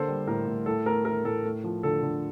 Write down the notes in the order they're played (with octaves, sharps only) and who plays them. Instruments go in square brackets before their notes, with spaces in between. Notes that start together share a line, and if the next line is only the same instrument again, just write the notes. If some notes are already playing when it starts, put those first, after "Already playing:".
Already playing: [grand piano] D3 A#3 A4 C5
G3
A2 A#4
A2
A2 A4
A3 A#4
A3 A#4
A2 A4
A3
F3
D3 A4
D3